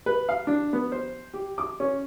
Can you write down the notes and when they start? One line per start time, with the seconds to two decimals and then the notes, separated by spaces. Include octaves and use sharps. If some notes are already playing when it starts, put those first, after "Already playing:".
0.06 B4
0.29 F5
0.47 D4
0.73 B3
0.92 C5
1.34 G4
1.58 D6
1.80 C#4